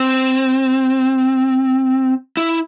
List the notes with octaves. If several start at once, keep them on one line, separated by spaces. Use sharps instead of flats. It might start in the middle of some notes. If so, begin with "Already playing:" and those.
Already playing: C4
E4